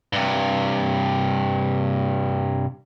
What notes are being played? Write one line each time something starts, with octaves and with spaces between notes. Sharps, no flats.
G2 C3